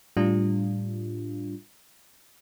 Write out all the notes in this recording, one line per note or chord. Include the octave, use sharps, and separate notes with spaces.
A2 G3 D4 F4